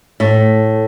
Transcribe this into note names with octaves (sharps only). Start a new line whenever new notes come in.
A2 A3